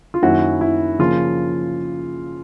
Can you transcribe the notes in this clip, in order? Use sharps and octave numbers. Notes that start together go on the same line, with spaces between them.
F4
F#2 D#3 F#3 A#3 E4 F#4
E4
C#3 F3 A#3 F4